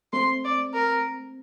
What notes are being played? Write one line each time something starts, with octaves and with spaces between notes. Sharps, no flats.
A3 C4 C6
D5
A#4